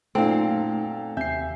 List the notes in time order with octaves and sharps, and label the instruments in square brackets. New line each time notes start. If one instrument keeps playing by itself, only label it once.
[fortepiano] F#2 A#2 [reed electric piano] A3 D#4 [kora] C4 [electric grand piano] A4 F5
[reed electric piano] D#2 G#5 G6 [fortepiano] C3 [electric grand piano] E5 C7